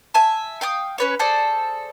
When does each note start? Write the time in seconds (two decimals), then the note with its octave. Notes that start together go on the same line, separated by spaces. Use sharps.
0.14 E5 G#5 A5
0.61 F5 G5 C#6 D#6
0.98 C#4 B4 C#5
1.19 G#4 A4 C5 D5